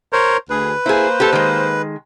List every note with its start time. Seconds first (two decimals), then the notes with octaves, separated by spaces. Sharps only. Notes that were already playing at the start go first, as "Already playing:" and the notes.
0.13 A#4 C5 C#5
0.50 D2 G#4 B4
0.86 A#3 E4 G#4 C5
1.20 G4 A4
1.33 D#3 G#3